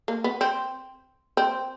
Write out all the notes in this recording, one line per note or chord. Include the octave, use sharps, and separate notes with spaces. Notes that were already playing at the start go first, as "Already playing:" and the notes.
A#3
B3
C4
C4